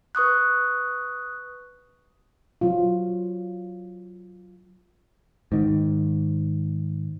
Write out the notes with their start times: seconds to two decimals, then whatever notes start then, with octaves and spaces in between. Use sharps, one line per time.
0.15 B4 C#6 D#6 F#6
2.61 F#3 F4
5.52 G#2 D#3